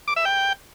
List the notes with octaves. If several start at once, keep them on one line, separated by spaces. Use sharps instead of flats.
D6
E5
G5